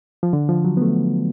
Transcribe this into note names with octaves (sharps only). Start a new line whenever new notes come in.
F3
D3
F3
F#3
B3
A3